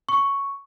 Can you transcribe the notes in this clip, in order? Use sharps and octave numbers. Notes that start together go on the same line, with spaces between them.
C#6